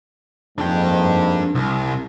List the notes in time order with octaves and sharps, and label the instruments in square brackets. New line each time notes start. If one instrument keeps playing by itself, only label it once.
[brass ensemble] F2 G#2 A#3 [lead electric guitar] D4 G5
[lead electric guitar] C2